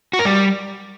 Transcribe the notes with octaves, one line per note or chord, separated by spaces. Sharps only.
F#4
A#4
G3